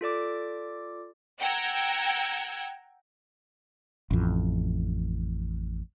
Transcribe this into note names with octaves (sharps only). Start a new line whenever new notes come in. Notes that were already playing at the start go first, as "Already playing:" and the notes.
F4 A4 D5 D6
F#5 G5 A#5 E6 G#6
A1 F2